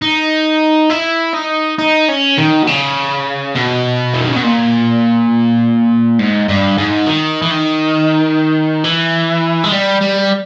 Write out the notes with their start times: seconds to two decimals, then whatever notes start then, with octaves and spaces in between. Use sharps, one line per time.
0.02 D#4
0.91 E4
1.34 D#4
1.79 D#4
2.09 C#4
2.38 D#3
2.63 B2
2.67 C#3
3.55 B2
4.13 E3
4.21 D#3
4.28 C#3
4.36 B2
4.43 A#2
6.19 G#2
6.48 G2
6.78 G#2
7.07 D#3
7.42 E3
7.51 D#3
8.84 E3
9.64 G#3
9.72 G3
10.01 G3